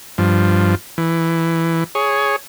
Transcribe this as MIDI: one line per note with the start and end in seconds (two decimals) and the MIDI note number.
0.18 0.75 43
0.18 0.75 53
0.98 1.84 52
1.95 2.36 68
1.95 2.36 73